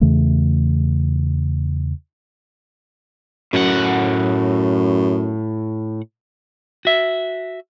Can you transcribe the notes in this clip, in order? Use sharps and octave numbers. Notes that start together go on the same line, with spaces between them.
E2 C#3 E3 A3
F#2 A2 F#5
F#4 E5